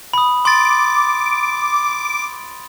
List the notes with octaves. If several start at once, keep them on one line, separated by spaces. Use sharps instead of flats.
B5 D#6
C6 D6 A6